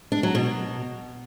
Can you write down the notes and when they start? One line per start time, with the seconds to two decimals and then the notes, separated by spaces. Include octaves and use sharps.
0.12 D4
0.23 F#3
0.35 B2